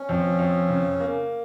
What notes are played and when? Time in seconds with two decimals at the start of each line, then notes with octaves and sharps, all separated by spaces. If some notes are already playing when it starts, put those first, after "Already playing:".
Already playing: C#4
0.09 F2
0.39 F2
0.69 C#3
1.00 A#3